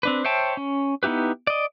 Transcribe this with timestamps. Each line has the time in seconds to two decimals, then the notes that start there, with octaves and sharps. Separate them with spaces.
0.03 C4 D4 B4
0.25 C5 C#5 E5 G5 A5
0.57 C#4
1.03 B3 D#4 E4 G4 B4
1.47 D5 D#5